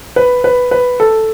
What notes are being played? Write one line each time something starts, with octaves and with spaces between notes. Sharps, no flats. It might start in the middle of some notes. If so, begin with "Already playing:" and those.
B4
B4
B4
A4